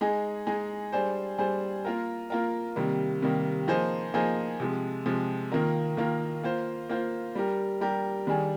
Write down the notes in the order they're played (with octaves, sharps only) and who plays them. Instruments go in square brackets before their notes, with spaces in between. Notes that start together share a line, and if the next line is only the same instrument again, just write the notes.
[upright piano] G#3 D#4 G#4
G#3 D#4 G#4
G3 D4 G#4 C5
G3 D4 G#4 C5
A#3 F4 A#4
A#3 F4 A#4
C3 D#3 G3 A#3
C3 D#3 G3 A#3
F3 A#3 D#4 G#4 C5
F3 A#3 D#4 G#4 C5
C3 F3 G#3
C3 F3 G#3
D#3 A#3 F4 A#4
D#3 A#3 F4 A#4
A#3 F4 C5
A#3 F4 C5
G3 D4 G4 A#4
G3 D4 G4 A#4
D#3 G3 D4 G#4